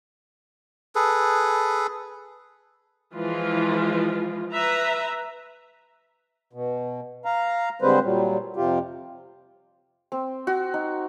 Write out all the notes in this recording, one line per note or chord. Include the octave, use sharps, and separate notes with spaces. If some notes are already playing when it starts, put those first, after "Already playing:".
G#4 A4 B4
E3 F3 G#3 F4
B4 E5 A#5
B2
F5 A#5
D3 G3 G#3 C4 B4 C5
A#2 F#3 G3
F2 C3 F4 G4
C4
F#4
D#4